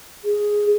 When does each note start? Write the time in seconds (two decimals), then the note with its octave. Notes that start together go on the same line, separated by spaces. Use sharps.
0.25 G#4